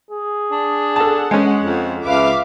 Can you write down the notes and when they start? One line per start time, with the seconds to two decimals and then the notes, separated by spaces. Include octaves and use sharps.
0.11 G#4
0.52 D4
0.96 A4 F#5 A5
1.31 G#3 C#4
1.64 F2
2.06 C#2 B4 E5 F5 D6